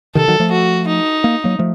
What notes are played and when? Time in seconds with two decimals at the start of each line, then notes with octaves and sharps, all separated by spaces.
0.15 C3 D#3 A4
0.28 D#3 F#3
0.40 F3 A3
0.51 F#4
0.87 D#4
1.24 A#3
1.44 F#3 A#3
1.59 F3 A3